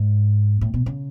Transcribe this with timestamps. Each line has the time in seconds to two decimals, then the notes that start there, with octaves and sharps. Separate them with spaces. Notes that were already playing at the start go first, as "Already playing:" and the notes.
Already playing: G#2
0.61 A2
0.74 B2
0.86 C#3